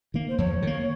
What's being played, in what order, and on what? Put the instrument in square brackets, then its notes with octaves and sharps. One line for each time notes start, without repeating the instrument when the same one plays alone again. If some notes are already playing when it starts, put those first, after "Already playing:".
[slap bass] D#3 A#3
[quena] C5
[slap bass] F2 [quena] C#5
[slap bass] D#3 A#3